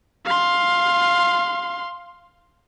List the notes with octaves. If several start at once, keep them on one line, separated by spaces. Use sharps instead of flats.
F5 C6